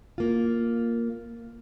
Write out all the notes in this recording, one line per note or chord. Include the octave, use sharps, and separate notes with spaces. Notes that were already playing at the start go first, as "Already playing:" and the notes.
A#3 F4